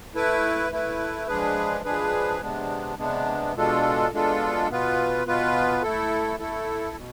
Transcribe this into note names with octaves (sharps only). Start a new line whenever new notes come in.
A3 E4 B4
A3 E4 B4
F3 G#3 D4 G#4 B4
F3 G#3 D4 G#4 B4
C3 G#3 B3 D4
C3 G#3 B3 D4
B2 G#3 D4 F4 A4
B2 G#3 D4 F4 A4
B2 B3 F4 B4
B2 B3 F4 B4
A3 E4 A4
A3 E4 A4
B2